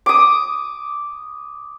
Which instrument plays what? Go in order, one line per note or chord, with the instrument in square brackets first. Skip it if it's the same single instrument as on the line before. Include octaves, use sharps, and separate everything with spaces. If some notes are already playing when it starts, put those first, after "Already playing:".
[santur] D6 D#6